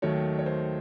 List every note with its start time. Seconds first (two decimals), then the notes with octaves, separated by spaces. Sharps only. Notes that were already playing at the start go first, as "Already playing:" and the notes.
0.02 D#2 D#3 F#3 A3 C#5
0.39 C#5
0.46 C5